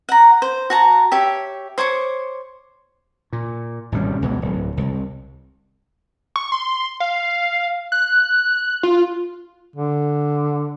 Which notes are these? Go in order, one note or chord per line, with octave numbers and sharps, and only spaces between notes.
F#5 A#5
C5
F#4 A5 A#5
G4 C#5 E5
C5 C#5 C#6 D6
A#2
G#1 B2 G3 C#4
C#2 B2 E3
D1
C2
C#6
C6
F5
F#6
F4
D3